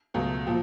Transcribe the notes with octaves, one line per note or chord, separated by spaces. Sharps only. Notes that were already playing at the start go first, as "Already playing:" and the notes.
C#2 B2 F#3 A3
A#2 F3